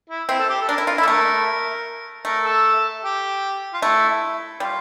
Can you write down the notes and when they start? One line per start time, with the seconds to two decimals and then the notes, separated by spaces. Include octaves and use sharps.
0.09 E4
0.29 C4 E4
0.39 A4
0.49 G4
0.62 A4
0.68 D4 A#4
0.78 E4
0.87 F4
0.98 E4 A4
1.03 A#3
1.07 A3 A#4
2.25 A3 A#4
2.44 A4
3.04 G4
3.74 F4
3.82 A3 E4
4.60 G3 F4